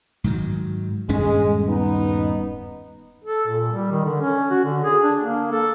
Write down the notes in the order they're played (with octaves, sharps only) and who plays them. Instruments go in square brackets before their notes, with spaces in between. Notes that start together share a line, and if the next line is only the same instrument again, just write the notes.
[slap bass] G#2 D#3 F#3
[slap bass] D#1 G2 C#4 [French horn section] G#3
[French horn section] B3 D#4
[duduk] A4
A#2
G3
D#3
D3
C#4
F#4
D3
G#4
D4
A#3
A4